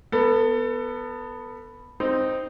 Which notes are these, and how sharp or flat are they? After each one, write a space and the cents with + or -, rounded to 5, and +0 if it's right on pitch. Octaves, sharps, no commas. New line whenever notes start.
B3 +0 A4 +30
C4 +0 D#4 +0